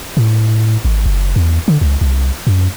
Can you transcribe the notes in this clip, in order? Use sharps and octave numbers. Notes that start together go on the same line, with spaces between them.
A2
G#1
F#1
E2
D3
C#2
C2
F#2